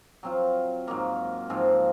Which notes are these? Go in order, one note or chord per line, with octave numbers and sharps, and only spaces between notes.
F#3 C4 F4
G#2 F#3 A#3 F4
G#2 F3 C4 F4